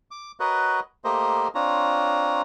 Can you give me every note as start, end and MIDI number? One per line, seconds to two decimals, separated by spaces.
0.11 0.32 86
0.40 0.80 66
0.40 0.80 70
0.40 0.80 71
0.40 0.80 73
0.40 0.80 75
0.40 0.80 78
1.04 1.48 57
1.04 1.48 58
1.04 1.48 67
1.04 1.48 70
1.04 1.48 72
1.04 1.48 75
1.55 2.42 60
1.55 2.42 62
1.55 2.42 65
1.55 2.42 73
1.55 2.42 82